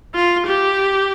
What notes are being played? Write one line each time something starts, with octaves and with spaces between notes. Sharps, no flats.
F4
G4